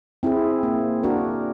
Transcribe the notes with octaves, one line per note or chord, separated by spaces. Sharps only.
C4 E4 G#4
A#3
D4 F#4 A#4